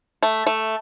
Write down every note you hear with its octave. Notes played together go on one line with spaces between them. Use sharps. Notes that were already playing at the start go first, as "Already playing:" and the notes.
A3
A3